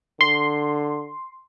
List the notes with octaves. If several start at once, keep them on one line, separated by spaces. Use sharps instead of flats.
D3 C6